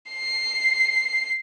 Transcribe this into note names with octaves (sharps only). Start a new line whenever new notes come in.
C7